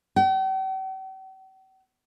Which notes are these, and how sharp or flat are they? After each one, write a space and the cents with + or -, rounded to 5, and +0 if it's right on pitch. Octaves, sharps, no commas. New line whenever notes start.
G5 -45